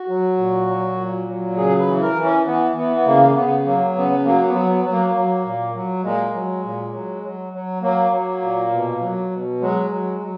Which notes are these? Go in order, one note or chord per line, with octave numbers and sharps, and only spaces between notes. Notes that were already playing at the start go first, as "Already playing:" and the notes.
Already playing: F#4
F#3
A#2
F#3
A#2
F#3
C#3 G#4
B4
E3
A#4
E3
C#4
E3 B3
E3 B3
B3
C#3 A#3
C#3 B3
F#3 A#3
C#3 B3
F#3 A#3
B3
F#3
B3
F#3
A#3
F#3
A#2
F#3
A#2 G#3
F#3
A#2
F#3
F#3
F#3
F#3 A#3
F#3
A#2
B2
F#3
B2
F#3 G#3
F#3
F#3